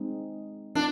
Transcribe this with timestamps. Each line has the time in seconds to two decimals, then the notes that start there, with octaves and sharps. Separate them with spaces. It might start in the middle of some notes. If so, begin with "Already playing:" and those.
Already playing: G#3 C4 D#4
0.75 C4 D4 F4 A#4